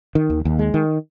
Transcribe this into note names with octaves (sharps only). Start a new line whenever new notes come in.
D#3
D#2
D#2
G#3
D#3